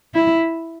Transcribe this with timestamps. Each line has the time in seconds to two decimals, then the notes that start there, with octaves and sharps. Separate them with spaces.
0.15 E4